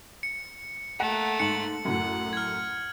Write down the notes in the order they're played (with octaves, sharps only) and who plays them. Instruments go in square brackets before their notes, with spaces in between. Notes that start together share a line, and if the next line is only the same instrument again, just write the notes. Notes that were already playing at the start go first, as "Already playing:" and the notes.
[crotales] C#7
[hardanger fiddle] A3 A#3 [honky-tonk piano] F#5
[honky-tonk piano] G#2 [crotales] C#7 F#7
[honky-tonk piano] F#2 A2 [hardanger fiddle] F#5
[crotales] F6 G#6